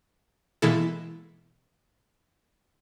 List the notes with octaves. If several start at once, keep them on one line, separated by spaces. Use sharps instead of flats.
B2 E3 G#3 A#3 E4 A4